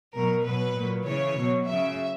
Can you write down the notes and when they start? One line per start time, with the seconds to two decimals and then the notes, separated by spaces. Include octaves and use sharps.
0.14 B2 F#3 A#4
0.44 B2 F#3 B4
0.74 A#2 F#3
1.04 C#3 E3 C#5
1.36 B2 F#3
1.66 C#3 F#3 E5